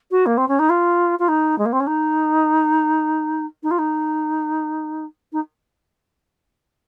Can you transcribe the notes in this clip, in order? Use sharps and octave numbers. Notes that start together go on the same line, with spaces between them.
F#4
A#3
C4
C#4
D#4
F4
F4
D#4
G#3
A#3
C4
C#4
D#4
D#4
F4
D#4
D#4